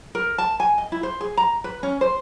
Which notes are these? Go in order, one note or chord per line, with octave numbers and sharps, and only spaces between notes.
A#4
A5
G#5
D#5
E4
C5
G#4
A#5
B4
C#4
C5